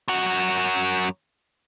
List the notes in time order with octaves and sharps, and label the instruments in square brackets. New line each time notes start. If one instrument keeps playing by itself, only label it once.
[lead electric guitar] F#2 F#4